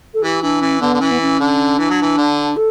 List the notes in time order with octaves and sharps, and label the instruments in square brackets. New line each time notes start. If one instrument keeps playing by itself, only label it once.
[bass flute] A4
[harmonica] E3 [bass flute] G4
[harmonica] E3 [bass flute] D4
[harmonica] E3 [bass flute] C#4
[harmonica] D3 [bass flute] B3
[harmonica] D3
[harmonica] E3 [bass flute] C#4
[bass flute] B3
C#4
[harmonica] D3
[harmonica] E3 [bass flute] D4
[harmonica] F#3
E3
D3
[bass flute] A4